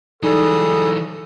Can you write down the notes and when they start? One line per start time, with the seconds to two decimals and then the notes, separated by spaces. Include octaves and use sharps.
0.23 E3 F#3 G3 D#4 G#4 A4 D#6